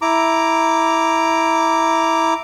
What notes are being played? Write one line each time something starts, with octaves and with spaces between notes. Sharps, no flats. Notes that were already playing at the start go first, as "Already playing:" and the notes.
E4 A#5 D6